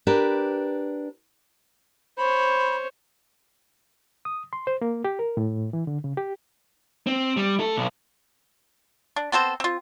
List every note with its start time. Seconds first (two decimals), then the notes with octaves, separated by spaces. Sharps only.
0.07 D4 G4 A#4 B4
2.18 C5 C#5 B5
4.25 D#6
4.53 C6
4.67 C5
4.81 A#3
5.04 G4
5.19 A#4
5.37 A2
5.73 E3
5.87 D3
6.04 C#3
6.17 G4
7.07 C4
7.37 G3
7.60 A3 A4
7.76 B1
9.16 D4
9.32 B3 C4 A4 C5
9.60 C4 F4